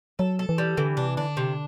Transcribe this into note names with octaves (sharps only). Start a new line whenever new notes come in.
F#3 A4
A4
E3
G3
D3 E3
C3 D4
D3 D4
C3